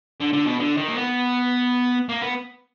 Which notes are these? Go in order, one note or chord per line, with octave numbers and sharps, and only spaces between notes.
D3
D3
B2
D3
D#3
A#3
B3
A#3
B3